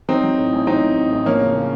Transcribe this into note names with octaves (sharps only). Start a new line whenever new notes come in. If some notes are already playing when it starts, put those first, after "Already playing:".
F#3 C4 D#4
F#3
A2
A1
F#3 C4 D#4
A1
A1
A1
F3 A#3 C#4
C#3
C#3